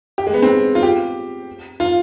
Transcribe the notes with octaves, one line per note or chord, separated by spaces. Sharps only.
G4
G#3
B3
C4
F4
G4
F4